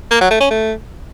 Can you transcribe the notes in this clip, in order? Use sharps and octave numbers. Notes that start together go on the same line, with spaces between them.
A#3
F#3
A3
C#4
A3